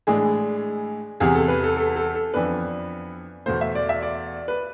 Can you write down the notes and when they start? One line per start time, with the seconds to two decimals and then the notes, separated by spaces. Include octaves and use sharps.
0.07 A2 E3 G#3 D4 G#4
1.20 E2 C3 E3 G#4
1.35 A4
1.48 B4
1.63 A4
1.77 A4
1.96 A4
2.15 A4
2.34 F2 E3 B3 D4 B4
3.46 E2 B2 A3 C5
3.61 E5
3.75 D5
3.89 E5
4.03 D5
4.48 B4